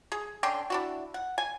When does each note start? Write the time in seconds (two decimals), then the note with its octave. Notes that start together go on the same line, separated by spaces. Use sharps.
0.12 G#4
0.43 D3 C#4 G5 C6
0.70 D4 E4 F#4
1.14 F#5
1.38 G#5